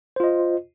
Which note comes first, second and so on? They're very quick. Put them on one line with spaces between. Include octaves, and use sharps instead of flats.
C5 F4 D#5